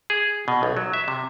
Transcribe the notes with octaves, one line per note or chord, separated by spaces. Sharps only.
G#4
B2
B1
F#3
E5
C3